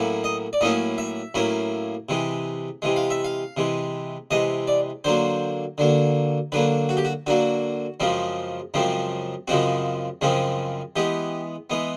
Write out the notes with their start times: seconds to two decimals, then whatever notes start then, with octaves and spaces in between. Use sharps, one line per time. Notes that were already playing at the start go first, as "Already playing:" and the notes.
Already playing: A2 F#3 A#3 C#4 E4
0.24 D#5
0.53 D5
0.61 A2 F#3 A#3 C#4 E4 D#5
0.98 E5
1.34 A2 F#3 A#3 C#4 E4
2.09 C3 E3 G#3
2.82 C3 E3 G#3
2.96 F5
3.10 E5
3.24 F5
3.57 C3 E3 G#3
4.31 C3 E3 G#3 D#5
4.67 D5
5.04 D3 F#3 A#3 C5
5.78 D3 F#3 A#3
6.52 D3 F#3 A#3 B4
6.89 F#4
6.97 G4
7.05 F#4
7.27 D3 F#3 A#3 F#4
8.00 F#2 C#3 F3 G#3 C4
8.74 F#2 C#3 F3 G#3 C4
9.48 F#2 C#3 F3 G#3 C4 F#4
10.21 F#2 C#3 F3 G#3 C4
10.96 E3 G#3 B3 G4
11.70 E3 G#3 B3